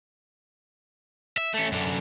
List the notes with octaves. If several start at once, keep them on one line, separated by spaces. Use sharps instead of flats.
E5
A3 C#4
F#2 D3